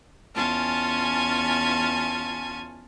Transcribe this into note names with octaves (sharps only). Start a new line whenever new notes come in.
E2 C#4 F4 G#5 A5